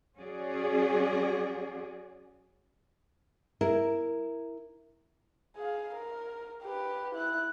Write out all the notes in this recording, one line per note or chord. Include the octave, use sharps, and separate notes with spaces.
F#3 C#4 F#4 G#4 D5
E4 A#4
G#4 F5
A#4
G4 B4
E4 F#6